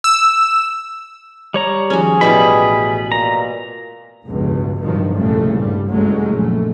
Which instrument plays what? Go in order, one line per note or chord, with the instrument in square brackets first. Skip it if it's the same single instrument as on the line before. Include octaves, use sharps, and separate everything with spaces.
[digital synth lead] E6
[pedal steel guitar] G3 C#5 A#5
[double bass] D#3 F3 [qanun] C#4 F#4 [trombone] G#4
[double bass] A1 [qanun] B2 G3 E4 [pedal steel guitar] B5
[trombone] A#2 [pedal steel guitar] A#5
[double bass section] F1 C#2 G2 B2
A1 G2 C3 D#3 F3 F#3
C2 F2 A#2 C#3 A3
G2 G3
F#1 C2 F#3 G#3 A3 C#4
A#1 A3